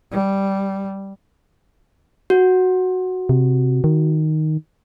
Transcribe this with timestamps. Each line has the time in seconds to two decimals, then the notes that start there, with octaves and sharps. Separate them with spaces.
0.11 G3
2.30 F#4
3.29 C3
3.84 D#3